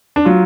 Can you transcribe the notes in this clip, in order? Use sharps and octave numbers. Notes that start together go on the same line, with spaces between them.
D4
F#3 F4